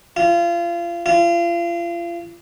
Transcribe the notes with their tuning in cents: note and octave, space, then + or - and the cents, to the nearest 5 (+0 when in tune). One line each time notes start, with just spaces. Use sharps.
F4 -30
F4 -35